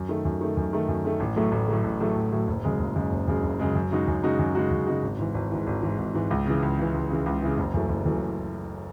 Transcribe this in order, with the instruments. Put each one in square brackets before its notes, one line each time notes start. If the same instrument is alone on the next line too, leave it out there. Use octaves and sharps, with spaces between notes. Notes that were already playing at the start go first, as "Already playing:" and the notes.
Already playing: [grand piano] F#2
D#3 A3
F#2
D#3 A3
F#2
D#3 A3
F#2
D#3 A3
A1
A2 F#3 A3
A1
A2 F#3 A3
A1
A2 F#3 A3
A1
A2 F#3 A3
F#1
F#2 C#3 G#3
F#1
F#2 C#3 G#3
F#1
F#2 C#3 G#3
F#1
F#2 C#3 G#3
F#2
C#3 G#3 D#4 F#4
F#2
C#3 G#3 D#4 F#4
F#2
C#3 G#3 D#4 F#4
F#2
C#3 G#3 D#4 F#4
G#1
G#2 E3
G#1
G#2 E3
G#1
G#2 E3
G#1
G#2 E3
C#2
C#3 E3
C#2
C#3 E3
C#2
C#3 E3
C#2
C#3 E3
F#1
F#2 E3 A3
F#1
F#2 E3 A3